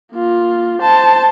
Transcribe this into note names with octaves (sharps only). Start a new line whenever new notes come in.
A#3 F4
C5 A5